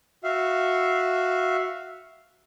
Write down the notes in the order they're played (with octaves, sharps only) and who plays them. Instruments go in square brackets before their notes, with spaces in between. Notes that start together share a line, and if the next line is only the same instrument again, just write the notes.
[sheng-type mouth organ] F#4 E5 F5